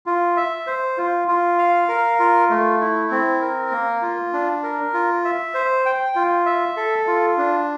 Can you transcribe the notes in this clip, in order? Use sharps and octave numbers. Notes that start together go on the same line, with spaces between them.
F4
E5
C5
F4
F4
F5
A#4
F4
A3
E4
C4
A#4
A#3
F4
D4
A#4
F4
E5
C5
G5
F4
E5
A4
F4
D4